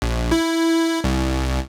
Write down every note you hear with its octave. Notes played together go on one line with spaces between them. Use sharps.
A#1
E4
C2